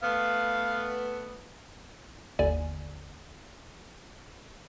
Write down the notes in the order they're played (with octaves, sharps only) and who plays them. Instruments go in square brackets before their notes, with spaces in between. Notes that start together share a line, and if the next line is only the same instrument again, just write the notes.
[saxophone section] A3 B3 [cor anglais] F5
[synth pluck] G1 D#2 D3 D5 G#5